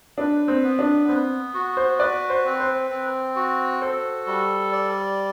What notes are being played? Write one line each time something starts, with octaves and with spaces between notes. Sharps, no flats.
D4 B4
C4
B3
D4
B3 C4
F#4
C5
B4 D5
C5
C4
C5
C4
F#4
A4 C5
G3
D5